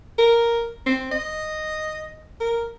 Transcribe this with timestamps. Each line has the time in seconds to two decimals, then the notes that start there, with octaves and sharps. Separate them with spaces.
0.18 A#4
0.86 C4
1.11 D#5
2.40 A#4